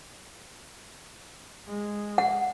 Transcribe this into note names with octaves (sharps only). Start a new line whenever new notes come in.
G#3
F#5